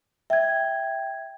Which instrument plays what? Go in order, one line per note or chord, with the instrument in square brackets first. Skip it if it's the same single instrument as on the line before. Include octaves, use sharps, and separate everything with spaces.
[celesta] E5 G#6 [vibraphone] G5